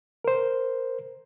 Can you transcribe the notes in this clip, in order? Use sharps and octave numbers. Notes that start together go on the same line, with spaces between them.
A#4 C5